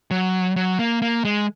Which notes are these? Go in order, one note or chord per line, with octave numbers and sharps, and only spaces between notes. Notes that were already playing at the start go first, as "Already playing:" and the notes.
F#3
F#3
A#3
A#3
G#3